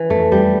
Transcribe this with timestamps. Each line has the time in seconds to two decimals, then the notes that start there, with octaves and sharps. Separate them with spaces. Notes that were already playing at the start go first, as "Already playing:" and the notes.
Already playing: E3
0.10 F2 A3
0.32 F2 G3